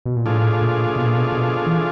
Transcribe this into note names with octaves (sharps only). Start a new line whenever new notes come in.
B2
A#2
A2 F3 A3 D4 F4 G#4
A#2
B2
A#2
B2
B2
E3